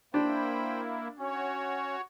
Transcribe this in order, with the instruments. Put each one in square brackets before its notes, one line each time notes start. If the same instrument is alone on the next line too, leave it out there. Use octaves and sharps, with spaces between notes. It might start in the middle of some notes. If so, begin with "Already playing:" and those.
[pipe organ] A#3 E4 [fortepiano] D4 [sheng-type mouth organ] C5 G5 B5
[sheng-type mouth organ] C#4 [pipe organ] F#4 C#5